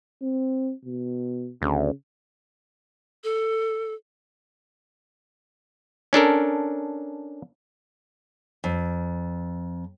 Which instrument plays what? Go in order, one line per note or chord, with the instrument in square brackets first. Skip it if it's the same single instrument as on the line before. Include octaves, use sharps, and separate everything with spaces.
[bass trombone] C4
B2
[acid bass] D2 [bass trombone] C#3
[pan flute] A4
[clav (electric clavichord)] C#4 D4 A4 A#4
[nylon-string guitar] F2